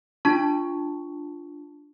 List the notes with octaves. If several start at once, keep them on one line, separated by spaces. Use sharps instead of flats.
D4 F4 A5 C#6